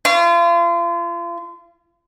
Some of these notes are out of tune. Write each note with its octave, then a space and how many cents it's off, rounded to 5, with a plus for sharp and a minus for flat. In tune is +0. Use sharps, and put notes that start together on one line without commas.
F4 -35 C#6 +0